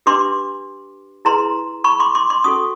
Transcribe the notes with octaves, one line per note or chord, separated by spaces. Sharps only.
D4 G4 B4 C6 D6
E4 G#4 B4 A#5 C6
B5 C#6
C6 D6
C6 D6
C6 D6
C#4 F#4 A4 C#6 D#6